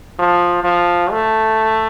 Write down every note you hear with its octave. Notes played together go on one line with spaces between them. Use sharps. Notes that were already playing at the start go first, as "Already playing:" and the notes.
F3
F3
A3